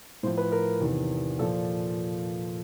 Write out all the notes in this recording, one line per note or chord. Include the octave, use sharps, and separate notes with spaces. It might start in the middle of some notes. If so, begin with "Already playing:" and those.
A2 F3 C5
B4
A#4
E2 C3 D#3
A#2 F3 A4